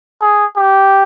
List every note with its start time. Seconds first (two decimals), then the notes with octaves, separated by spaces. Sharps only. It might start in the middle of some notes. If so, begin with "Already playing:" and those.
0.21 G#4
0.56 G4